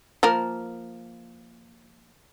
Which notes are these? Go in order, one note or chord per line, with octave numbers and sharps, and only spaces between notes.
F3 A#3 A#4